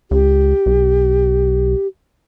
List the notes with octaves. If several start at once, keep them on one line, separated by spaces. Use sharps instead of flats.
C#2 G4
B1